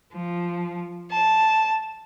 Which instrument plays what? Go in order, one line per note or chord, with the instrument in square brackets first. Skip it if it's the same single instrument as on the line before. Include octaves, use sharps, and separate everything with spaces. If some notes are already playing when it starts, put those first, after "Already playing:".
[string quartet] F3
A5